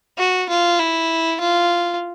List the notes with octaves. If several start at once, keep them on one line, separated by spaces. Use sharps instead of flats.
F#4
F4
E4
F4